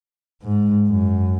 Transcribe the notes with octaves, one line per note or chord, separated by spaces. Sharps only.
G#2
F#2